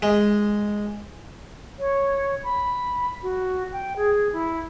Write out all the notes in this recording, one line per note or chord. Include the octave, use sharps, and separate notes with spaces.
G#3
C#5
B5
F#4
G5
G#4
E4